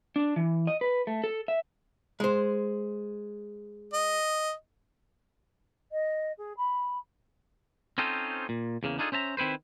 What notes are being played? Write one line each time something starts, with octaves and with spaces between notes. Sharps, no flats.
D4
E3
D#5
B4
A3
A4
E5
G#3 C5
D#5
D#5
G#4
B5
C4 C#4 D#4 F4 A4 C5
A#2
E2 C#3 A#3
D4 D#4 F4 G#4 A4
C#4 C5 E5 A5 A#5
D#3 C4 E4 B4 C5